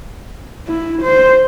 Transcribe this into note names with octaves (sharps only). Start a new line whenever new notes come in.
E4
C5